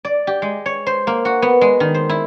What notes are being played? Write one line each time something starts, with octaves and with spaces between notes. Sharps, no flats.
D5
G4
G#3
C#5
C5
A#3
F#4
B3
G#3
D#3
C5
E4